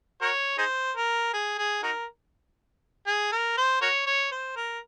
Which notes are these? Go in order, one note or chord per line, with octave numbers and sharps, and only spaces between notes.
F#4 A#4 C#5
D#4 G#4 C5
A#4
G#4
G#4
D#4 F#4 A#4
G#4
A#4
C5
F#4 A#4 C#5
C#5
C5
A#4